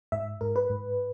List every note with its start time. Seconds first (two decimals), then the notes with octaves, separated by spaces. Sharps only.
0.12 G#2 E5
0.41 G#2 A#4
0.56 B4
0.70 G#2